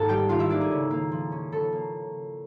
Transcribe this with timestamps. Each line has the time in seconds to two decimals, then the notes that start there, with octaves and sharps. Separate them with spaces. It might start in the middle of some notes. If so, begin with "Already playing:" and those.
Already playing: G#2 D#3 A#3 A4 A5
0.08 G3 G4 G5
0.29 D#3 F4 F5
0.39 E4 E5
0.50 A#3 D4 D5
0.61 G#4
0.71 C#3
0.91 A#3
1.11 F3
1.32 C#4
1.52 C#3 A4
1.73 A#3